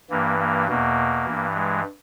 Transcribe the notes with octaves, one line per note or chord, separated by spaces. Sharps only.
G2 E3 A#3
A#3
E2 B2 A#3
E3
G2
G#3